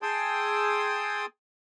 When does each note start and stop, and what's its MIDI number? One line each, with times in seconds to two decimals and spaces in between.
0.02 1.26 68
0.02 1.26 79
0.02 1.26 81
0.02 1.26 84
0.02 1.26 87
0.02 1.26 88